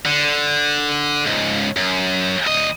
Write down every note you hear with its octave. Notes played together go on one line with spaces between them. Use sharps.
D3
C#2 G#2
F#2
D2 D#5